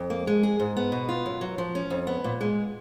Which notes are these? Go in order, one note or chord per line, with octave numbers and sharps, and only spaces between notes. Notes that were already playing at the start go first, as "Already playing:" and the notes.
Already playing: F2
A#3
G#3
G#4
G#2
B3
B2
F4
F#2
F#3
F3
C#4
F2
B3
A#2
G#3